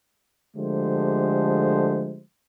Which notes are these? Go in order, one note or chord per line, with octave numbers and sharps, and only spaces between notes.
D3 F3 G#3 A3 G4 C5